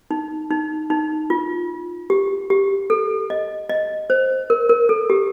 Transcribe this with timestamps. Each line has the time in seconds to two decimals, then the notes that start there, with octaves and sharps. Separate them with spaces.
0.11 D#4
0.51 D#4
0.90 D#4
1.30 F4
2.10 G4
2.50 G4
2.90 A4
3.30 D#5
3.69 D#5
4.10 C5
4.50 A#4
4.69 A#4
4.89 A4
5.10 G4